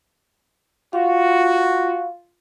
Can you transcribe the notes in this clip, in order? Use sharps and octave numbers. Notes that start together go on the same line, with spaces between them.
F4 F#4 F5